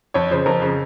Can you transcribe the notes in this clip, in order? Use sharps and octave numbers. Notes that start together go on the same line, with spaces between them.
F2 C#5
C#3 F3 C5
F2 A#4
C#3 F3